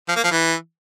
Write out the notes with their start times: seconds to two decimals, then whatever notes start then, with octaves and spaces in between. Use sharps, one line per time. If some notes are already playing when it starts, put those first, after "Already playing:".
0.09 F3
0.16 A#3
0.24 F3
0.31 E3